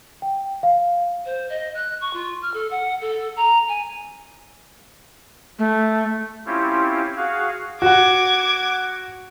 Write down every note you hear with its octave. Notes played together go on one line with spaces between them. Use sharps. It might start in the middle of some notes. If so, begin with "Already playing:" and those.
G5
F5
C5
D#5
F#6
C#6
F4
F6
A4
F#5
A4
A#5
G#5
A3
C4 C#4 E4 F4 G4
F#4 G#4 F5
F#4 F#5 D6 G#6